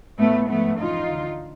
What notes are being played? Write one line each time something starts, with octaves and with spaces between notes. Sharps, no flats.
A2 E3 A3 B3
G#2 F3 A3 B3
F2 C#3 E3 D#4 F4
D2 D3 F3